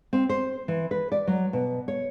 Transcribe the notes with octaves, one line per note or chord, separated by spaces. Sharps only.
C4
C5
E3
B4
D5
F#3
B2
C#5